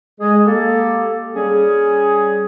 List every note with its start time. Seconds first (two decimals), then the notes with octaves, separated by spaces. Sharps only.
0.20 G#3 G#4
0.45 A#3 G4 A4
1.34 G3 C#4 G#4